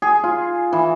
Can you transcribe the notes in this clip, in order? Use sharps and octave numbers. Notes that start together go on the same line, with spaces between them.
G#4
F4
E3